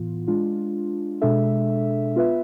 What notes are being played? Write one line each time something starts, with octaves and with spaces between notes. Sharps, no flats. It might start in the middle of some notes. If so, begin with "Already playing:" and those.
Already playing: A2 E3 B3 F4
G#3 D4 F4
B2 G#3 D4 A4 E5
B3 F4 B4 E5